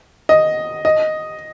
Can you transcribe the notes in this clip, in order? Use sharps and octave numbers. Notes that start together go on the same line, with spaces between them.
D#5
D#5